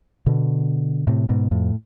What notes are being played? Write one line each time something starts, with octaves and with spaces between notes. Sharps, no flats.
B2 D3
A2 C3
G#2 B2
F2 A2